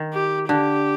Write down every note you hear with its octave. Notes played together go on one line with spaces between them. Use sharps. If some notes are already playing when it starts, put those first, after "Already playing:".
Already playing: D#3
G4
D3 G4